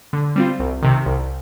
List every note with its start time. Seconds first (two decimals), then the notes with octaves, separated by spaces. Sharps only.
0.13 D3
0.36 G3 C4 F4
0.59 C2
0.82 C3 D#3
1.06 C2